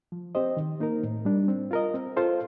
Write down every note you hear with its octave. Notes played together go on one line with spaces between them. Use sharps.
F3
C4 G4 C5 D#5
D#3
A#3 D#4 A#4
A2
G3 D4
C4
F4 A#4 D#5
C4
F4 A4 C5 F5